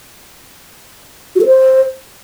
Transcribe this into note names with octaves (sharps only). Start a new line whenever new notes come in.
F#4
A4
C5